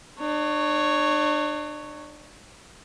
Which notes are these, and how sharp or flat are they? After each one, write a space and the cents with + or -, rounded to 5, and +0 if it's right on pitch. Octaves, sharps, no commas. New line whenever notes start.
D4 +40 C#5 +0